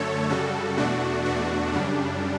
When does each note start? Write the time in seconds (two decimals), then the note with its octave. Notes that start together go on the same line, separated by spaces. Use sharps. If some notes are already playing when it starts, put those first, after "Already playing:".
Already playing: F#2 D3 A3 A4 C#5
0.29 F#2 C#3 G3 F#4 A4
0.78 E2 B2 A3 D4 F#4
1.25 E2 B2 A3 D4 F#4
1.73 F#2 C#3 G3 D4